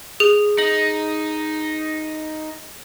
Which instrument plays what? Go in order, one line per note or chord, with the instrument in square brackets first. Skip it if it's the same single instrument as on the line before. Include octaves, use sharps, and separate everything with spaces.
[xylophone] G#4
[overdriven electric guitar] D#4 [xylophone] F#7